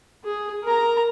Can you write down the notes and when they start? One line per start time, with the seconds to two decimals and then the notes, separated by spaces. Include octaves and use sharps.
0.25 G#4
0.64 A#4 A#5